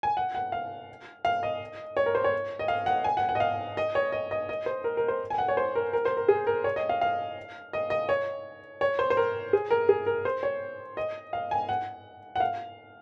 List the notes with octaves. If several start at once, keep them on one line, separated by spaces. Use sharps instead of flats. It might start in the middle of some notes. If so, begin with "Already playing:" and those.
G#5
F#5
F#5
F5
F5
D#5
C#5
A#4
C5
C#5
D#5
F5
F#5
G#5
F#5
F#5
D#5
F5
D#5
C#5
D#5
D#5
D#5
C5
A#4
A#4
C5
G#5
F#5
C#5
C5
A#4
A#4
C5
A#4
G#4
A#4
C#5
D#5
F5
F5
D#5
D#5
C#5
C#5
C5
C5
A#4
G#4
A#4
G#4
A#4
C5
C#5
D#5
F5
G#5
F#5
F#5
F5